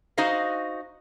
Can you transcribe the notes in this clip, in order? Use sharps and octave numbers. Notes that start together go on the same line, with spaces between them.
D#4 F#4 C5 D#5 F5